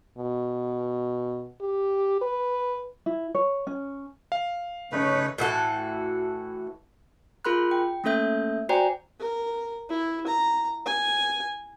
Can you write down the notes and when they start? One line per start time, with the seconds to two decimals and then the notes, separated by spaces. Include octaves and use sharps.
0.17 B2
1.61 G4
2.22 B4
3.06 E4
3.35 C#5
3.67 C#4
4.32 F5
4.92 C#3 A3 C#4 D#4 B4 C#5
5.38 A2 E3 F#4 A4
7.45 F4 G#4 A#4 B5 C6 F#6
7.71 G5
8.04 A3 A#3 C#4 A4 E5 G6
8.69 F#4 C5 D5 G5 G#5 A#5
9.20 A#4
9.90 E4
10.27 A#5
10.86 G#5